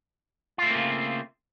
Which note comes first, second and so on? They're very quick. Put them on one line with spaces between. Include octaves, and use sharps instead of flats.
F4 A3 C4 A#3 C#3